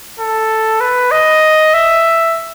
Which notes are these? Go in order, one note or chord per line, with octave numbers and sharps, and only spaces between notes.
A4
B4
D#5
E5